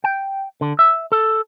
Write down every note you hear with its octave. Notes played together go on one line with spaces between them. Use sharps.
G5
D3
E5
A4